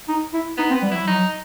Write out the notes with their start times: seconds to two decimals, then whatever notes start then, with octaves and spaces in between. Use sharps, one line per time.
0.09 D#4
0.33 E4
0.58 B3 D#4
0.70 C4
0.75 B3
0.82 G3
0.92 F#3 E4
1.07 F#3 D#4